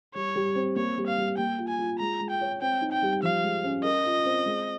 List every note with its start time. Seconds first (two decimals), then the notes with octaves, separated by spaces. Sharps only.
0.15 G3 C#5
0.35 G3
0.56 C4
0.76 A#3 C#5
0.97 G3
1.07 F5
1.18 G3
1.38 A#3 G5
1.58 F4
1.68 G#5
1.79 F4
1.99 G#3 A#5
2.21 G#3
2.30 G5
2.41 C#5
2.61 C4 G5
2.82 D#4
2.92 G5
3.02 G3
3.23 F3 F5
3.43 G#3
3.64 C#4
3.84 A#4 D#5
4.05 F4
4.25 C4
4.46 G#3